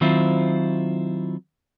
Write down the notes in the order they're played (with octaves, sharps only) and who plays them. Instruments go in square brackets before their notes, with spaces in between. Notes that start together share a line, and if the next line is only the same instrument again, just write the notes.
[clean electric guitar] D#3 F#3 C4 E4 F4 C5